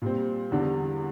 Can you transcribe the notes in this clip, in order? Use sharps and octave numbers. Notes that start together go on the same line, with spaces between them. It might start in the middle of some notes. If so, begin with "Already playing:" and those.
A#2 G3 C4
E2 D3 G3 D4